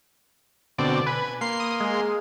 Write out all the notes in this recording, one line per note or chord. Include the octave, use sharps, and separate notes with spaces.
B2 D3 C4 D5
B4 G#5
A#3 C6 C7
D#6
G#3